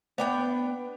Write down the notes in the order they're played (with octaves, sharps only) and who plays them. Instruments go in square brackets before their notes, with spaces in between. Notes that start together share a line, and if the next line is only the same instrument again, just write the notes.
[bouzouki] B3 D4 G5